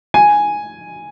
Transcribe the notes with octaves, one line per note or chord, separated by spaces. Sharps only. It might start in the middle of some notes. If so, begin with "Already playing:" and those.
G#5